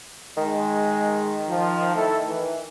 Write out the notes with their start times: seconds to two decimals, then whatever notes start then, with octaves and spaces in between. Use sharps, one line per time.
0.37 D#3 G#3
1.48 F3
1.94 A3 E4 A4
2.26 E3